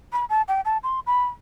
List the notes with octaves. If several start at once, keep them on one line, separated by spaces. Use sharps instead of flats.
B5
A5
G5
A5
C6
B5